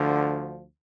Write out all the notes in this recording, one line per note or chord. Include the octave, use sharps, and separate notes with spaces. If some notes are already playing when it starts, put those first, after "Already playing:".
Already playing: D2 D3 F3